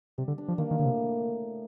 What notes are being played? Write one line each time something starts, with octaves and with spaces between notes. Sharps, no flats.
C3 G3
D3
D4
F3
D#3 A#3
D#3
A2 D3
C3